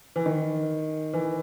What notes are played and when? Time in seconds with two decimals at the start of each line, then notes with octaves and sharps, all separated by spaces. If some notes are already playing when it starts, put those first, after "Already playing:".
0.16 E3
0.26 D#3
1.13 E3